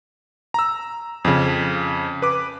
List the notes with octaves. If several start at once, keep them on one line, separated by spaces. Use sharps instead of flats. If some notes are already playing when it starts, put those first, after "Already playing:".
A#5 E6
F2 C#3
B4 D6